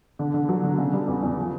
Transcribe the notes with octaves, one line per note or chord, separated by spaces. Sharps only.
D3
D3
F#3
D3
C#3
G3
E2
E2
F3